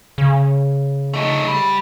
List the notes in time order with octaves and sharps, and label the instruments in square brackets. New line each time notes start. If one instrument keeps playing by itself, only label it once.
[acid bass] C#3
[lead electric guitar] A3 D#4
G3